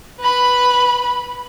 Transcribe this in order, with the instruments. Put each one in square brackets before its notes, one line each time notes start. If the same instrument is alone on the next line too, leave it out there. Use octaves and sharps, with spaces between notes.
[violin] B4 B5